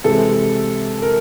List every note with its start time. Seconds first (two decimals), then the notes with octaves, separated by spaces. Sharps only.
0.04 C3 E3 G#3 A4
1.02 A#4